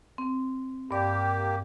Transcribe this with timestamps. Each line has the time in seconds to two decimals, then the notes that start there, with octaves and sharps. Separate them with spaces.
0.18 C4
0.91 G2 A#3 G4 D5